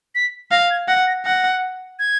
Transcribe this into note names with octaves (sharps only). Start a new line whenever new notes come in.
B6
F5 A#6
G#6
F#5 A#6
A#6
F#5 A#6
G#6